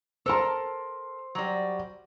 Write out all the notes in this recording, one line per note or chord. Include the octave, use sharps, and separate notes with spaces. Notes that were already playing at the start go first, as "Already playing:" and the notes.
A4 A#4 C5 A5 C6
F#3 G3